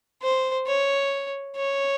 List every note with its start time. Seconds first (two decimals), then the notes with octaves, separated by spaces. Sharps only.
0.22 C5
0.67 C#5
1.56 C#5